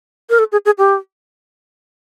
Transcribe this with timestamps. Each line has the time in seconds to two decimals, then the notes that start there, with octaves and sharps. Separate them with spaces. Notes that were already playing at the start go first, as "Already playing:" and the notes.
0.30 A#4
0.39 A4
0.52 G#4
0.65 G#4
0.78 G4